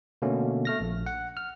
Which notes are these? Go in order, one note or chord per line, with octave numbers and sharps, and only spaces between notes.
B2 D3 A3 A#3 C#4
A3 F6 A#6
A#1
F#5
F6